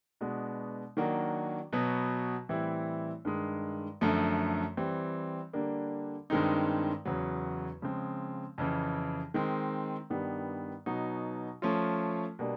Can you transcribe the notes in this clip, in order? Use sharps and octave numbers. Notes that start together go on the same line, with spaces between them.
B2 G#3 B3 D4 F#4
D#3 F#3 A#3 D4 F#4
B2 F#3 B3
A2 E3 G3 C4 E4
G2 D#3 G#3
F#2 D3 F3 A3
E3 G3 C4
D3 G3 A#3 D4
G2 D#3 G#3 C4 D#4
E2 C#3 F#3
C#3 F3 G#3 C4
F2 C#3 E3
D#3 G#3 C4
G2 D#3 G3 B3
B2 F#3 B3 D#4
F3 A3 C#4 F4
B2 G3 A#3 D4